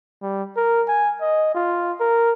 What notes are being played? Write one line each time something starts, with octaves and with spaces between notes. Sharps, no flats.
G3
A#4
G#5
D#5
F4
A#4